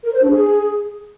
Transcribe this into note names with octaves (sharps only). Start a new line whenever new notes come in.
A#4
C5
D4
G#4